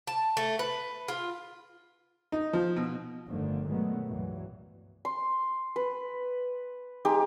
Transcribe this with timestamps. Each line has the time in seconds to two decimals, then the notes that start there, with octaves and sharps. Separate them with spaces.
0.07 A5
0.37 A3
0.59 B4
1.08 F4
2.32 D#4
2.53 F3
2.76 B2
3.27 G1 F2 D3 D#3 F3 A3
3.65 B2 D#3 F#3 G#3 A3 B3
4.05 C#2 G2 A#2 E3 F#3
5.05 C6
5.76 B4
7.05 G#3 D#4 G4